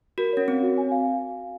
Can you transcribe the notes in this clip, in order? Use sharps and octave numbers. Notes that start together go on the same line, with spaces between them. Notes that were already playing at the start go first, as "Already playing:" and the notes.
F#4 A#4
C#4 C#5
C4 C#5
F#4
G#5
F5